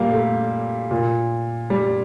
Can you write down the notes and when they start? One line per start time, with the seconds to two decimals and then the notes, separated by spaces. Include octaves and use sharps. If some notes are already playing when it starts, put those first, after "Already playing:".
Already playing: A#2 G3 A#3
0.12 A3
0.91 A#2
1.70 G3